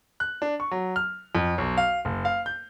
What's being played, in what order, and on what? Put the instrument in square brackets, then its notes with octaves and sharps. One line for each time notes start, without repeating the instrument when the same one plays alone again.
[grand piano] F#6
D4
C#6
F#3
F6
F2
B1
F5
F#1
F5
G6